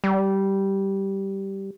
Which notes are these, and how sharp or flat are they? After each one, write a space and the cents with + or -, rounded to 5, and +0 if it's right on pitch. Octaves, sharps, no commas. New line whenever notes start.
G3 -10